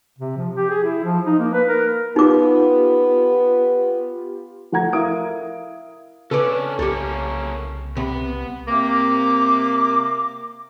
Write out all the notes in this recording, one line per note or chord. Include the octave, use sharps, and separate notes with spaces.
C3
F3
G4
G#4
E4
F3
D#4
A#3
B4
A#4
B3 D#4 F4 G4 D6
F3 A3 F#5 A#5 G#6
E4 A#4 F5 D#6 D7
C#3 C#4 D4 A4 B4 D5
C2 A#3 C#4 G4 A4
C3 B3 B5
C3 A#3 D6